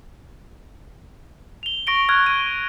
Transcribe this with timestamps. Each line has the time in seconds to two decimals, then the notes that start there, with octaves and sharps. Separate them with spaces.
1.63 F7 G7
1.87 C#6 A#6 D7 G7
2.09 C#6 F6 F#6 G#6
2.27 D#7